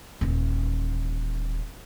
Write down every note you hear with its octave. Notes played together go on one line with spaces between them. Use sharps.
D#1 E3